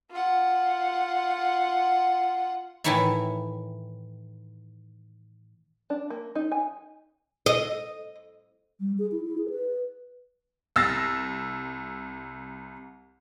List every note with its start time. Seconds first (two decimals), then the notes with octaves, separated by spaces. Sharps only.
0.11 F4 F#5
2.84 A2 D#3 E3 E4 C#5 E5
5.90 D4
6.10 A#3
6.35 D#4
6.52 G#5
7.46 D#5
8.80 G3
8.99 G#4
9.12 E4
9.24 E4
9.38 G#4
9.50 B4
10.76 C2 E6 A6 A#6 C7